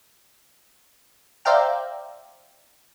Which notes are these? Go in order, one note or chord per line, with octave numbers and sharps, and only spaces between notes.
C5 D5 E5 F5 G5 A#5